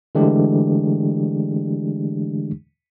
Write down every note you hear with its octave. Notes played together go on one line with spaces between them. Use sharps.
D3 E3 G#3 A3 D4 G4